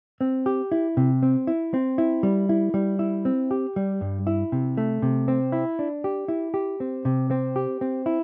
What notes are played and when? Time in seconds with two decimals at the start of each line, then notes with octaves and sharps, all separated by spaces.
0.21 C4
0.46 G4
0.72 E4
0.97 C3
1.23 C4
1.47 E4
1.74 C4
1.98 E4
2.23 G3
2.49 E4
2.74 G3
2.99 E4
3.25 C4
3.51 G4
3.76 G3
4.01 G2
4.27 E4
4.52 C3
4.77 A3
5.02 C3
5.28 C4
5.52 E4
5.79 D4
6.04 G4
6.28 E4
6.54 G4
6.80 C4
7.05 C3
7.31 C4
7.56 G4
7.81 C4
8.06 E4